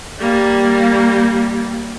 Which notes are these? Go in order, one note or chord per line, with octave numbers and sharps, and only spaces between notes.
G3 A#3